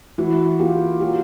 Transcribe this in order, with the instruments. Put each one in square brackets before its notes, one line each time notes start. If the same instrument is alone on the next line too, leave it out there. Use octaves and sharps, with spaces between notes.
[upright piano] E3 [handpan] E4 F#4
[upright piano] A#3 [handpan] F4 G4
[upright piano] F#3 [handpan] F4 G4